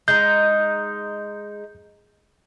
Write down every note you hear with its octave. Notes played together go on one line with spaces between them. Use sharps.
G#3 D#4 G6